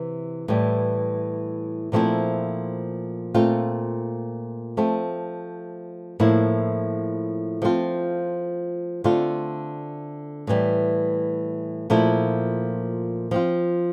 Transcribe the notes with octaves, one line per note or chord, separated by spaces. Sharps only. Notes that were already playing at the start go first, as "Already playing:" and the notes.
Already playing: C3 E3
A2 E3 G3
A#2 F3 A3 C4 E4
A#2 A3 C4 F4
F3 A3 C4
A2 F3 A#3 E4
F3 A3 C4 F4
D3 A3 C4 F4
A2 E3 G3
A#2 F3 A3 E4
F3 C4 F4